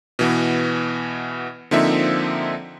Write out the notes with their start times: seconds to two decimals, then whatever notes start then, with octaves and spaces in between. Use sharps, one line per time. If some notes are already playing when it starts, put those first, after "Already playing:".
0.19 B2 E3 B3
1.71 D3 F3 A#3 C4 D#4 E5